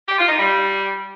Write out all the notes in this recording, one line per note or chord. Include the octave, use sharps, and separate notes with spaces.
G4
F4
D#4
G3